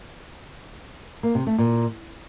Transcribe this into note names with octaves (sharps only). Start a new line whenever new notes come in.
A#3
C3
A3
A#2